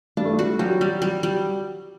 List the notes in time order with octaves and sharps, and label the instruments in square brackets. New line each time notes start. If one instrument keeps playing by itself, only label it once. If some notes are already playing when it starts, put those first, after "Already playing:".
[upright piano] G3 [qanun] D4
[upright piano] A3
G3
[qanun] F#4
[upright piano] F#3 [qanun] G3
[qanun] G3
G3
G3